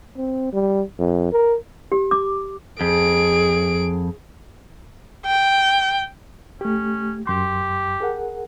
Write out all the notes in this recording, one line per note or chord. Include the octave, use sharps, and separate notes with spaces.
C4
G3
F2
A#4
G4
D6
F2 G#4 D7
G5
A3 C#4 G4
F#2 G4 C6
G#4 A#4 F#5